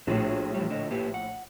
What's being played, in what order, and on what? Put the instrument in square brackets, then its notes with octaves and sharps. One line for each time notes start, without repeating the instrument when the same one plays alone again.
[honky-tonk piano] A#1 A2 [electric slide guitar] D4 F#4 G#4
[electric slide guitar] E2 G3
D3 D#5
A#3 G4 B4
F#5